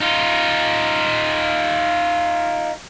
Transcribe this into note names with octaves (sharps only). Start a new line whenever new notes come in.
D#4 F4